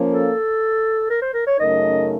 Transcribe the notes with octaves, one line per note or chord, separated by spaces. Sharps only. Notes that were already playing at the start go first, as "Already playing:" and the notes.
Already playing: F3 A#3 C#4
A4
A#4
C5
A#4
C#5
F#2 C#3 A3 D#4 A#4 D#5